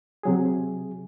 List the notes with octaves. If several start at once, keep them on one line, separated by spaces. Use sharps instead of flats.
C3 F#3 G#4